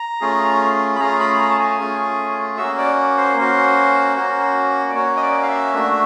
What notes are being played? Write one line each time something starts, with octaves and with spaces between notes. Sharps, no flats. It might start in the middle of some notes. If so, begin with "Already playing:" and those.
Already playing: A#5
A3 C#4 F4 G#4
B5
A3 C#4 F4 G#4 A#5
B5
B5
A#5
A5
G#5
A3 C#4 F4 G#4
A#3 C#4 F#4 E5
D5
C5
A#3 C#4 F#4
A#3 C#4 F#4
D5
A#3 C#4 F#4 C#5
D#5
D5
F5
E5
A3 D4 F#4